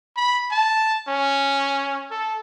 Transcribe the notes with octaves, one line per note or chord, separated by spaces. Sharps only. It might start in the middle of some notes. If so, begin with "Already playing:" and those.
B5
A5
C#4
A4